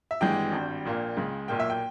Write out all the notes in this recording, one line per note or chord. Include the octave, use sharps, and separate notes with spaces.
E5
G#1 G2 E3 G#3 G5
G#1 G2 G3
A#1 A#2 A#3
C#2 C#3 G#3
B1 A#2 A#3 G5
E5
G5